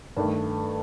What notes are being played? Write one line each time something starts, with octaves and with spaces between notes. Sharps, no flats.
G2 D#3 A3